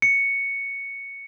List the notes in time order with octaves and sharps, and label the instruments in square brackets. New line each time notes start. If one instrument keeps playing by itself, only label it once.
[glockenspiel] C#7